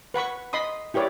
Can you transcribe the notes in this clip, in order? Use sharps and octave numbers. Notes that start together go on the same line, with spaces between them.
B4 F#5 B5 C#6
D#5 B5 C6 D#6
E4 G4 B4 C#5 D5